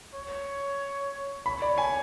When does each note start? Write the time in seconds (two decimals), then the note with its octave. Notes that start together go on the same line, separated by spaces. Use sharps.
0.15 C#5
1.45 C#5 B5
1.62 D5
1.78 G#5